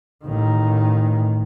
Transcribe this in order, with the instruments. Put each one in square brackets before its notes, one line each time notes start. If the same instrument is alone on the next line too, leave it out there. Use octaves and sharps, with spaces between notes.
[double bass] A1 D#3